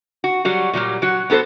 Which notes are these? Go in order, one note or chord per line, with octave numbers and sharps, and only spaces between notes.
F#4
F#3 G3 F#4
A#2 F#3 G3 A#3
F#3 F#4
B3 F#4 A4 B4 C5